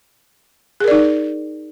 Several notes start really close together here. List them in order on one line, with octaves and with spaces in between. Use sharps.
G#4 A#4 D5 D#4